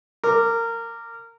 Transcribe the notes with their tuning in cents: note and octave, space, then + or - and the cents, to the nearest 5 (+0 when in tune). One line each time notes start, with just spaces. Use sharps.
A#4 -20 D6 +0